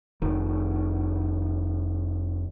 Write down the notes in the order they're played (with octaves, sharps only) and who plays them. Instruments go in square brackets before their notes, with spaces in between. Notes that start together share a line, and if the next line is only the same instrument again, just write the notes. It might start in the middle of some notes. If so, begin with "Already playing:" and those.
[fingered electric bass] F1 D#3